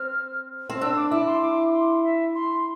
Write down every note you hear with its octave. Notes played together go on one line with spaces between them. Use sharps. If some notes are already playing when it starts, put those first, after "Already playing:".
Already playing: C4 F6
C4
D4 E6
D6
E4 D6
C6
D6
C6
E5
C6